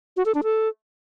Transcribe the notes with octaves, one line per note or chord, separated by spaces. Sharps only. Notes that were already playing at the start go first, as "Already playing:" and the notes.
F#4
A4
D4
A4